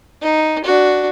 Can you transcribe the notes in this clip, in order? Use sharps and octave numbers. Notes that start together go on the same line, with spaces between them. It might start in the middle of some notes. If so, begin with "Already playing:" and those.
D#4
D4 F#4